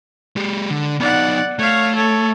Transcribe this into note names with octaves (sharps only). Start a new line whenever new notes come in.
G#3 G4
D3
B3 D#4 D5 F#5
A3 C#5 F5
A4 C#5